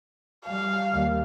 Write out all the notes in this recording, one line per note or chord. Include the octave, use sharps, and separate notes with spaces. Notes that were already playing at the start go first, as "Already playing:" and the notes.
G3 F5
D#2 G3